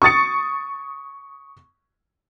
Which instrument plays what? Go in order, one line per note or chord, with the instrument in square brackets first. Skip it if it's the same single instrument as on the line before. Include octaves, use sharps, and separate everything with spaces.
[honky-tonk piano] C#6 D#6 A6 C#7